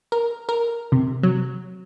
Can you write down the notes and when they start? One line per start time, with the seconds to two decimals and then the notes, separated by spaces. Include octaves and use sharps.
0.12 A#4
0.49 A#4
0.92 C3
1.23 F#3